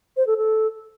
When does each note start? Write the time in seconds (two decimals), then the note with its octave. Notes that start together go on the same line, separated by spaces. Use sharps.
0.17 C5
0.27 A4
0.37 A4